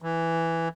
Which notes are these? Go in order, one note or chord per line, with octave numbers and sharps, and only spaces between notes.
E3